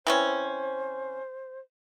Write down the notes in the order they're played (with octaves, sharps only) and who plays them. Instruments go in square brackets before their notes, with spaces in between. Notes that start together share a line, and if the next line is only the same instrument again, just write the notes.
[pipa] E3 C4 C#4 [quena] C5